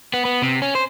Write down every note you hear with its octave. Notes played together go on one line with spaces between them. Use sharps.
B3
B3
C3
C#4
C5